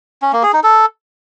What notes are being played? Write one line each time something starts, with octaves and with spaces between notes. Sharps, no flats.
C#4
A#3
G#4
D#4
A4